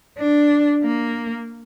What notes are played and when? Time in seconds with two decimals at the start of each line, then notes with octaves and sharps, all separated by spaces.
0.18 D4
0.84 A#3